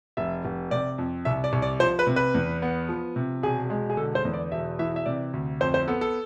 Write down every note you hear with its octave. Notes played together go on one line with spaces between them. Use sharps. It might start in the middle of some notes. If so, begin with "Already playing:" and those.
F1 E5
F1
C3 D5
F2
C2 E5
D5
C2
D5
F3 C5
B4
C3
B4
E2
B3
F3
C3
E1 G#4
G#3
G#4
D3 A4
C5
E2
D5
E1 E5
E3 E5
E5
C3 D5
D2
F2 C5
C5
B3 A4
A4